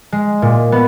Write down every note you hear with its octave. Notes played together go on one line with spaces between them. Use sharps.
G#3
A#2
B3